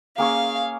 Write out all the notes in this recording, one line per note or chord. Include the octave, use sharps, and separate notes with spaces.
A#3 C#4 G#4 C#5 F5